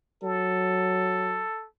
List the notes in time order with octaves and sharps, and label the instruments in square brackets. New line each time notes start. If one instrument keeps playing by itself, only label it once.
[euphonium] F#3 [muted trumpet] A4